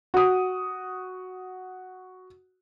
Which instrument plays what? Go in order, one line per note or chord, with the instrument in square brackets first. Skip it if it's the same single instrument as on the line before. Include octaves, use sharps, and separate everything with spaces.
[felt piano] F#4 D#6